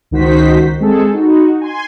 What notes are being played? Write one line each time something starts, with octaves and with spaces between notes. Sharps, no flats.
C#2 D#3 D#4 F#4 C5 B6
G#3 C4 G#4 A4
D#4 F#4
G#5 C6